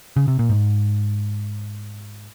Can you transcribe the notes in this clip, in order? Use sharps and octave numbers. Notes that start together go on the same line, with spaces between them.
C#3
C3
A#2
G#2